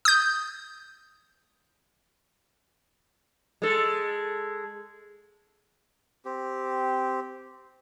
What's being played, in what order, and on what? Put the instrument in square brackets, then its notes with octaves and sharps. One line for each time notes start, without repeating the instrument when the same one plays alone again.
[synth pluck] D#6 G6
[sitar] G#3 A4
[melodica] C4 G4